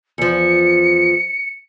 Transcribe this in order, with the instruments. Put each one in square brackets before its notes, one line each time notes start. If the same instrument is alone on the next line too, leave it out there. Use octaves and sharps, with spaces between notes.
[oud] E2 F3 [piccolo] C#7